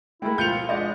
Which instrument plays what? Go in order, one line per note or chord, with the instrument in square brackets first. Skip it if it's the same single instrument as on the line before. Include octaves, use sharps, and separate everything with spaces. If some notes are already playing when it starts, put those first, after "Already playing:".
[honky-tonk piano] G#3 A3 [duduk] E4 [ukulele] A#4 G5
[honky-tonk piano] B2 F3 [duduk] F4 [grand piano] G6 C#7 F7
[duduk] G#3 [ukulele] D4 B4 D5 [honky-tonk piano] D#5 F#5